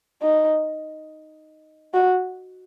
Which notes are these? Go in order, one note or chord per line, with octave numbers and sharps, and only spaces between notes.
D#4
F#4